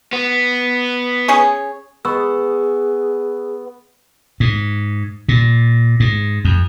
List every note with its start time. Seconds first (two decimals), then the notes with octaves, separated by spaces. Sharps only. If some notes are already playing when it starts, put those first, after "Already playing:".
0.13 B3
1.28 C#4 G#4 C#5
2.05 B3 G#4 C#6 E6
4.40 G#2
5.29 A#2
6.00 G#2
6.45 F2